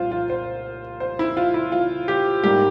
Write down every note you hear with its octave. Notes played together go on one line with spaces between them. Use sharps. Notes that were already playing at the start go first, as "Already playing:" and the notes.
Already playing: C2 A#2 F3 F4 C5
F4
C5
C5
E4
F4
E4
F4
G4
G#2 G3 A#3 G4